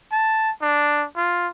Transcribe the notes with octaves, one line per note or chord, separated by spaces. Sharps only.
A5
D4
F4